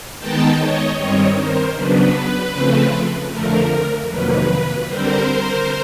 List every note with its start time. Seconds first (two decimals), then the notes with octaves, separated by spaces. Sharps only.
0.19 D#3 G#3 B3 D#4 G5 A5
0.59 C#5 D#5
0.97 G2 D#3 G3 C4 C#5 D#5
1.36 A#4 C5
1.75 C#3 F#3 B3 D4 B4
2.54 C#3 F3 A3 C4
3.31 F2 D3 F3 A3 A#4
4.09 F2 C3 D#3 F#3 A#3 B4
4.88 D3 G3 C4 A#4 C5